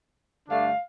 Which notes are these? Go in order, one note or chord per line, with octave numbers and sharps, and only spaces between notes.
G2 D3 A3 D4 F5